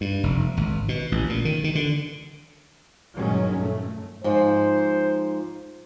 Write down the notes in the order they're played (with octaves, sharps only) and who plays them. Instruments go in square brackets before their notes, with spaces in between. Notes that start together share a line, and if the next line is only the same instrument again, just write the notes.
[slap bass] G2
F1
G#1
B2
A1
A#2
D#3
D#3
D3
[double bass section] G2 A#2 D#3 F#3 G#3 C#4
A#2 A3
[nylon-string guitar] G#2 F3 [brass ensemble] C5